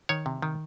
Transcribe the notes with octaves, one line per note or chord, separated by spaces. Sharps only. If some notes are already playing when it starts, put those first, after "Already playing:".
D#3 C#5
C3
D#3